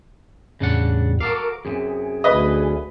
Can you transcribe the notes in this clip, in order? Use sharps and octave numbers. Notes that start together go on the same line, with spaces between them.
E2 A2 C#3 G3 D4 F#5
F#4 A4 A#4 F5 D6
F#2 A2 C3 G#4
D2 B4 D#5